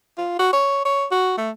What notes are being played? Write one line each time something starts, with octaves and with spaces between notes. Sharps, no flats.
F4
F#4
C#5
C#5
F#4
A3